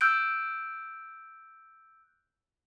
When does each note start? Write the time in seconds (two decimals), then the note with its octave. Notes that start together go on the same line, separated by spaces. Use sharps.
0.01 E6 F#6 G6 D7